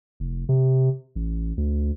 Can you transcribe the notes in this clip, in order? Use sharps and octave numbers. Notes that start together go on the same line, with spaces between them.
F1
C3
A1
D2